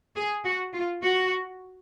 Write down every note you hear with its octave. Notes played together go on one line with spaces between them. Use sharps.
G#4
F#4
F4
F#4